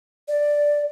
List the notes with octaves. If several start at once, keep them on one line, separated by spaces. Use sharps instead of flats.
D5